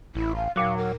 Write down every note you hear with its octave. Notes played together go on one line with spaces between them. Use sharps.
A1 E4
F5
D#2 A#2 F#3 F5 F#6
A#4